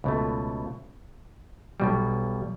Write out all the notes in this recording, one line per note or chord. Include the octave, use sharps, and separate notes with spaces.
C#2 B2 A3
B1 B2 G3